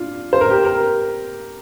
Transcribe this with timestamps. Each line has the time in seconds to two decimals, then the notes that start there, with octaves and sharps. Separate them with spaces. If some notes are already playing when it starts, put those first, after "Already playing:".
Already playing: D4 F4
0.33 C5
0.41 A#4
0.50 G4
0.64 A#4